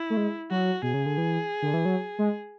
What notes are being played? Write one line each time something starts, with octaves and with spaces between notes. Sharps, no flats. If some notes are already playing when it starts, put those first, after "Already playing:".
Already playing: E4
A3
G#3
F#3 F#4
B2 G#4
C#3
D3
E3
D3
E3
F#3
G#3